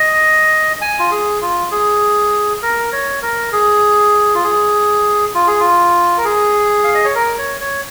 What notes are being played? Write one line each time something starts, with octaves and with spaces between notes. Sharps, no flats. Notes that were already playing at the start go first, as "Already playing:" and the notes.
Already playing: D#5
G#5
F4
G#4
F4
G#4
A#4
C#5
A#4
G#4
F4
G#4
F4
G#4
F4
A#4
G#4
F5
D#5
C#5
A#4
C#5
C#5